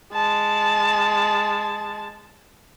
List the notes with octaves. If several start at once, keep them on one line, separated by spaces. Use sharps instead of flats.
G#3 A5